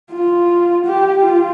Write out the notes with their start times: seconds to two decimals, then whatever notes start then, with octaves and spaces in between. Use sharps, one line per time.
0.11 F4
0.85 G4
1.24 F4